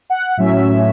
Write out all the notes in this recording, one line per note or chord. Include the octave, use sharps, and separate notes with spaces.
F#5
A2 F#3 C#4 E5